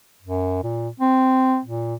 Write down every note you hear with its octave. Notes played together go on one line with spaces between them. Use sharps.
F#2
A#2
C4
A#2